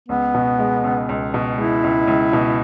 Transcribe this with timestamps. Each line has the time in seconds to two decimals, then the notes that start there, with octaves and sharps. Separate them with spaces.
0.08 C#2 B3
0.34 B2
0.59 G#3
0.84 C#2
1.09 C#2
1.34 B2
1.58 G#3 E4
1.84 C#2
2.08 C#2
2.33 B2